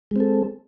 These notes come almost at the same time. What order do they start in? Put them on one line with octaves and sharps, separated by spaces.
G#3 C4 A4